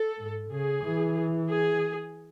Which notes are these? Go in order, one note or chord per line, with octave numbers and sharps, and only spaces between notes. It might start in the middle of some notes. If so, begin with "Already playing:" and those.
Already playing: A4
G#2
C#3 G#4
E3
G#4